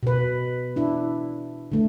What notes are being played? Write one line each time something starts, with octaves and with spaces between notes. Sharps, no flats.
B2 B4
D4 E4
D3 A3